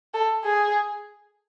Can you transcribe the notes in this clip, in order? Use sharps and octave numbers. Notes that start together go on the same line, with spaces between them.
A4
G#4